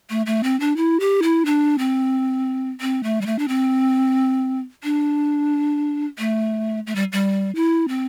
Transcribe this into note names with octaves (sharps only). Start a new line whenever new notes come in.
A3
A3
C4
D4
E4
G4
E4
D4
C4
C4
A3
G3
A3
D4
C4
D4
A3
A3
G3
G3
E4
C4